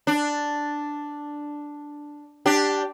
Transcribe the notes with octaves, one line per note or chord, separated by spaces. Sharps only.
D4
D4 G4